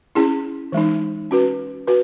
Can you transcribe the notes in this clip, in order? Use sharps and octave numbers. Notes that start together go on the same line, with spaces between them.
C#4 E4 G#4
E3 G#3 D#4
C#4 F#4 B4
F#4 B4